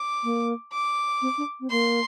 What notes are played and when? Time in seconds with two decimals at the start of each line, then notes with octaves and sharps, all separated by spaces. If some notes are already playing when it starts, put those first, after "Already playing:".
Already playing: D6
0.23 A#3
0.72 D6
1.21 C4
1.37 D4
1.60 C4
1.70 A#3 C6